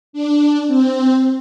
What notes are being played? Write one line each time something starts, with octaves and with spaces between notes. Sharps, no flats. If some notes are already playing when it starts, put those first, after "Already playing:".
D4
C4